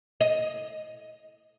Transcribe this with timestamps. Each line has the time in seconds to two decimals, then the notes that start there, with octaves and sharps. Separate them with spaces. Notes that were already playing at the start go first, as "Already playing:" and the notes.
0.21 D#5